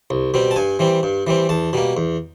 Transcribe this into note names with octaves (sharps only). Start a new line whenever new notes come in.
C2
B2 G3 C4
A5
G2 G#5
E3 G3 C4
G2
E3 G3 C4
E2 A5
B2 G3 A#3
E2